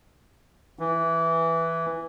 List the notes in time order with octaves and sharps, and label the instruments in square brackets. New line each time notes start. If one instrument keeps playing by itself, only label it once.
[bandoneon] E3